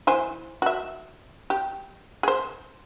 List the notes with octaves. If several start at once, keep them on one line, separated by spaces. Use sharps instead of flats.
E3 C5 G#5
F#4 E5
G4
G#4 C5